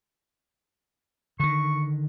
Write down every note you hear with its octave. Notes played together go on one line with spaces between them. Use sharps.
D3 D#3 C#6